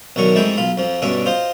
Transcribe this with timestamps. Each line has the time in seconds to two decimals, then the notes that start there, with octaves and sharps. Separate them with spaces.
0.16 B1 D3 D#3 F#3 C#6
0.36 F2 G#3 A3 D#4 E4 G5
0.57 B1 F4 B5
0.77 F2 F3
1.02 G2 B2 D3 C#4 E5 D6
1.26 F4 C5 D#5